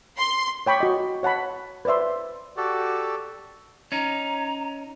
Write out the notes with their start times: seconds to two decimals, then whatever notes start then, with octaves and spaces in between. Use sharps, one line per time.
0.17 C6
0.66 C#5 G5 B5 C#6 D6
0.80 F#4 D#5
1.23 C#5 F#5 A5 B5
1.85 B4 C5 D5 E5 C6
2.57 F#4 G4 A4 D5
3.92 C#4 D#4 A#5